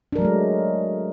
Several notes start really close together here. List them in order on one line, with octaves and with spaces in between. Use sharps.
D4 A#4 F#3 A3 G#3